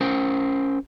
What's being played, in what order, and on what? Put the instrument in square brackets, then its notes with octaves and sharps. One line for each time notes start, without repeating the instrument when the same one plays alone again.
[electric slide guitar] C#4 A#4 C5